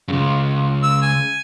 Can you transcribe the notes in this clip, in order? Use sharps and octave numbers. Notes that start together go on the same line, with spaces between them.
C#2 F#2 C#3
E6
G#5